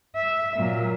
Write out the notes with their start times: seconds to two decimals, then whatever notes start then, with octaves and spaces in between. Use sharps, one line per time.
0.16 E5
0.56 A#2 F#3